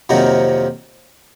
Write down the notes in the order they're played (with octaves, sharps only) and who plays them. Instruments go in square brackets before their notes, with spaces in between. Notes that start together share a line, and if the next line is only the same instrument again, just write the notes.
[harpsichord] F2 C3 D#3 F#3 A#3